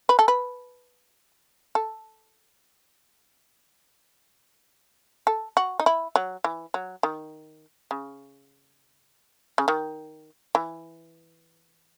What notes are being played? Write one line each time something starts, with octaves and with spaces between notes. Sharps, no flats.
B4
A4
B4
A4
A4
F#4
D#4
E4
F#3
E3
F#3
D#3
C#3
C#3
D#3
E3